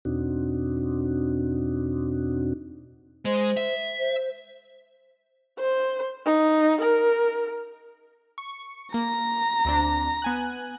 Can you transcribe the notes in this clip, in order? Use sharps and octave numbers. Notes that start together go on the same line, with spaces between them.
E2 B2 C4 D4 D#4 F#4
G#3 C5
E5
C5
C5
D#4
A#4
C#6
A#3 A#5
D2 C4 D4
B3 G#5 F#6